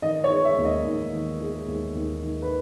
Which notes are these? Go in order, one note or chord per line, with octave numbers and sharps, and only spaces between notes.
D#3 D#5
C#5
G#3
E5
D#2
D#5
D#2
D#3
G#3
D#2
D#2
D#3
B4